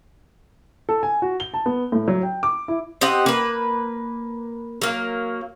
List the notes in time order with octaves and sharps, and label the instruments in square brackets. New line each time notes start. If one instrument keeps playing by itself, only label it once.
[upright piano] A4
G#5
F#4
G7
A5
B3
A2
F#3
G5
D6
E4
[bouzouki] C4 G4 D#5 F#5
A#3 B4
F#3 A#3